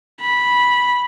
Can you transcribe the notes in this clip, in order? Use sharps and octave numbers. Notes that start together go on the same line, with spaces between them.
B5